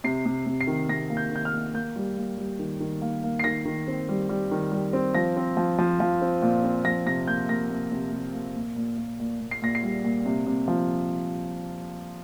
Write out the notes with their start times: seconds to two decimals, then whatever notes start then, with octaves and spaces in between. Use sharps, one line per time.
0.04 C3 C7
0.26 C3
0.46 C3
0.61 C7
0.67 D#3
0.89 C3 A#6
1.10 A#3
1.17 G6
1.31 D#3 G6
1.45 F6
1.53 A#3
1.74 A#3 G6
1.96 G3
2.17 A#3
2.38 G3
2.59 D#3
2.80 D#3
3.02 A#3
3.24 A#3
3.39 C7
3.44 D#3 A#6
3.65 D#3
3.87 C4
4.09 G3
4.29 G3
4.51 D#3
4.72 G3
4.93 C4
5.15 F3 A#6
5.37 C4
5.57 F3
5.78 F3
6.00 F3
6.22 C4
6.42 A#2
6.64 C4
6.85 F3 A#6
7.06 C3 A#6
7.27 A#3 G6
7.49 A#3 A#6
7.70 C3
7.92 C3
8.12 C3
8.34 A#3
8.55 A#2
8.76 A#2
8.98 A#2
9.19 A#2
9.40 A#2
9.51 C7
9.62 A#2 A#6
9.75 C7
9.82 G3
10.05 A#2
10.26 C3
10.47 C3
10.68 F3